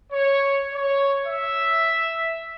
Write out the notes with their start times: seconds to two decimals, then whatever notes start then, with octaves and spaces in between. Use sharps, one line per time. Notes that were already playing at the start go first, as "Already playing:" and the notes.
0.11 C#5
0.73 C#5
1.24 E5